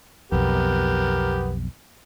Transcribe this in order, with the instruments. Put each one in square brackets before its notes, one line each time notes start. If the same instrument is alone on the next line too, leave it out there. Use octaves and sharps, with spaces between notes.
[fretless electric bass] B1 F2 [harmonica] B3 G4 A#4